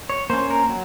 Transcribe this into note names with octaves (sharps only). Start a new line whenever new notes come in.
C#5
A#3 C#4 C5
A#4
F#3